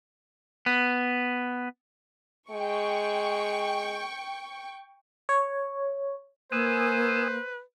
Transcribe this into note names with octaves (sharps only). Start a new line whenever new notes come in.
B3
G#3 G5 C#6
C#5
A#3 B4 C5 G#5 D#6 E6